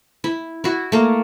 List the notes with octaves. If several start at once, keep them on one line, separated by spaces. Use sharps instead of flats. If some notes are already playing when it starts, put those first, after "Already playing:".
E4
E4 F#4
A3 A#3